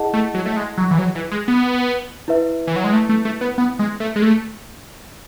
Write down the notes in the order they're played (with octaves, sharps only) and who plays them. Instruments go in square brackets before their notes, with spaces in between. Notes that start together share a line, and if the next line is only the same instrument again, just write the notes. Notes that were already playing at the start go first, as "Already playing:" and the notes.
Already playing: [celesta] E4 G#4 D#5 F#5 A5
[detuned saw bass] A3
F#3
A3
G#3
F#3
E3
F#3
E3
G#3
B3
[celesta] E4 B4 E5
[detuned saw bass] E3
F#3
G#3
A3
A3
A3
B3
B3
G#3
A3
G#3
A3